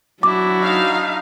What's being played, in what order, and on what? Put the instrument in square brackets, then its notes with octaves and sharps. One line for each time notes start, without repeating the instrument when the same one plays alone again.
[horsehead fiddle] F#3 F#4 [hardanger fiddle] D4 E4 [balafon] D6
[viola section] D#4 F5